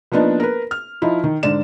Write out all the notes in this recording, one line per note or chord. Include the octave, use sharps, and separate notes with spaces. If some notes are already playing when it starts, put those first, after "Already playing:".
F3 A#3 B3 D4 D#4
A#4 B4
F6
F3 D#4 E4
D#3
G#2 D3 D5 E7